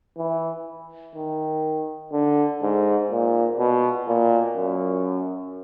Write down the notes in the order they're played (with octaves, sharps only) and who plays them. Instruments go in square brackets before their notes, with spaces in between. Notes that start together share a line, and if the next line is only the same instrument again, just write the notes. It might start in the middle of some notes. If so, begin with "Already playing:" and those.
[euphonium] E3
D#3
D3
G#2
A#2
B2
A#2
F#2